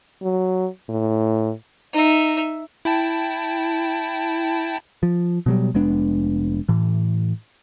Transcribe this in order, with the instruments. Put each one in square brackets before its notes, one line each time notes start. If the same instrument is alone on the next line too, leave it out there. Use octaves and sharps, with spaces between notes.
[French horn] F#3
A2
[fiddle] D#4 E5
[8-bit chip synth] E4 G5 A5
[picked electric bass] F3
B2 F#3 G3
F1 G#3 B3 D4
A2 E3